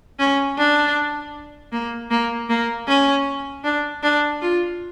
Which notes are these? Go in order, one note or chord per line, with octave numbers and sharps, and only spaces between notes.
C#4
D4
A#3
A#3
A#3
C#4
D4
D4
F4